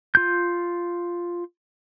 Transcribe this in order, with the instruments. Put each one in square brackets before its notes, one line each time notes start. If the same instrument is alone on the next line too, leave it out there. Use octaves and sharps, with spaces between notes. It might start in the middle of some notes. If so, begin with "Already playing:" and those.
[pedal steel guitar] F4 G6